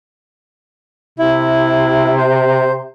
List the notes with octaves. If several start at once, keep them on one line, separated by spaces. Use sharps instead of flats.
C3 E4
C5